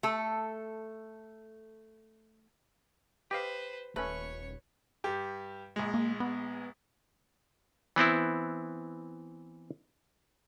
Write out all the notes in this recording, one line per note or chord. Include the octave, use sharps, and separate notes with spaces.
A3 A4
G4 B4 C5 D#5 F5
D#1 A3 C#4 B4 C#5 C#6
G2 G4
A#1 G#3
A#3
B3
E3 B3 C4 E4